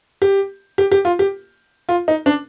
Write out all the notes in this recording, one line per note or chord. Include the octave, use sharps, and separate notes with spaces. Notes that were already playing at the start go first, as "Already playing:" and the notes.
G4
G4
G4
F4
G4
F4
D#4
D4